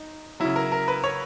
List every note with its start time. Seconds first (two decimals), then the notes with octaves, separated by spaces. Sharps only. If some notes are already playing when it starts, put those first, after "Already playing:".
Already playing: D#4
0.40 C#3 F#3 E4
0.56 A#4
0.72 A#4
0.88 B4
1.04 C#5